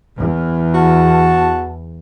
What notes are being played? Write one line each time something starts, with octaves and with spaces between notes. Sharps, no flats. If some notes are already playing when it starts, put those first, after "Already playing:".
E2
F#4 F#5 A5